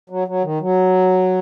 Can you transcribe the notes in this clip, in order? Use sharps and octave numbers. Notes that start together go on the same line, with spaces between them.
F#3
F#3
D#3
F#3